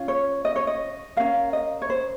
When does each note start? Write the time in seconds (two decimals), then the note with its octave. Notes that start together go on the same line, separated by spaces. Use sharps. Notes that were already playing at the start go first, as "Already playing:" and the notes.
Already playing: C#4 F4
0.08 C#5
0.45 D#5
0.56 C#5
0.67 D#5
1.17 C#4 F4 A#4 F5
1.53 D#5
1.82 C#5
1.90 C5